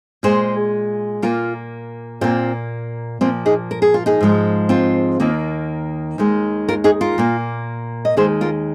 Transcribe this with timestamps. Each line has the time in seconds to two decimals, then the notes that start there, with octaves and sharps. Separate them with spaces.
0.23 A#2 G#3 G#4 C5
1.22 A#2 A#3 F4 A#4
2.21 A#2 A#3 C4 F4
3.21 A#2 F3 A#3 C4 F4
3.46 D#4 G#4
3.71 A#4
3.82 G#4
3.94 F4
4.06 D#4 G#4
4.21 G#2 F3 G#3
4.69 C4 F4
5.20 D#2 D#3 A#3
6.18 D#2 D#3 G#3
6.69 F4 A#4
6.84 D#4 G#4
7.01 F4 A#4
7.18 A#2 A#3
8.05 D#5
8.17 D#2 D#3 G#3 G#4 C5
8.41 F4 A#4